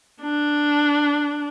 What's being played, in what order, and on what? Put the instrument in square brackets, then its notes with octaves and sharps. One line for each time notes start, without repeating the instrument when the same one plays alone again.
[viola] D4